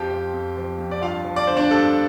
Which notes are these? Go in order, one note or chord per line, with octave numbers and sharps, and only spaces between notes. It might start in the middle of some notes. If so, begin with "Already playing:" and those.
Already playing: F2 F3 G4 G5
F3
F2
F3
F2
D5
G2 F4 F5
F3
D5
D3 C5
D4 D5
G2 A4